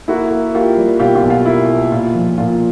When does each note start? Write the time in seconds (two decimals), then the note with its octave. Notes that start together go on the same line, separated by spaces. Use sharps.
0.08 A#3 E4 F#4
0.31 A#3
0.54 A#3 F4 G4
0.77 G3
0.99 B2 F4 G4
1.15 F4 G4
1.23 B1
1.30 F4
1.45 A#3 E4
1.69 A#3
1.91 A#2 F4
2.15 F3
2.38 A#2 F4